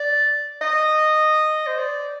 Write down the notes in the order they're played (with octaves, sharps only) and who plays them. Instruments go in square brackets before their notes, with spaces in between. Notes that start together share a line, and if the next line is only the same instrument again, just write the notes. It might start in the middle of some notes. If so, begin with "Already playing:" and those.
Already playing: [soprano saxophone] D5
D#5
C5
D5